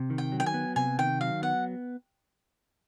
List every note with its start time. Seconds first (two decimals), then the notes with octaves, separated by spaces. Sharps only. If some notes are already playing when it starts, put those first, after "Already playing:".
Already playing: C3
0.10 D#3
0.18 G5
0.32 F#3
0.40 G5
0.46 G#5
0.54 B3
0.76 C3 G#5
0.99 D#3 G5
1.21 F#3 F5
1.42 B3 F#5